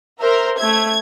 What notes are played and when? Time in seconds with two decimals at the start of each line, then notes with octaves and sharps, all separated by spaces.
0.21 A#4 C5 E5
0.58 A3 E5 G#6